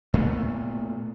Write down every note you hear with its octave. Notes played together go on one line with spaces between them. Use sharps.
A#2 A3 B3